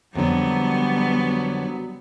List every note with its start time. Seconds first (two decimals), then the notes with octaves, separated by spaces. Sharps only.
0.15 F2 D3 F#3 G3 B3